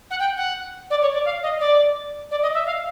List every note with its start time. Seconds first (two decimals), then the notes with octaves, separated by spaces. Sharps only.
0.10 F#5
0.19 G5
0.37 F#5
0.90 D5
1.01 C#5
1.13 D5
1.25 F5
1.42 D#5
1.60 D5
2.31 D5
2.42 D#5
2.54 E5
2.65 F5